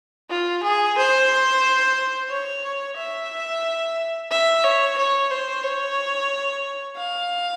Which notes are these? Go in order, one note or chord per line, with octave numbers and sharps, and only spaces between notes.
F4
G#4
C5
C#5
E5
E5
C#5
C#5
C5
C#5
F5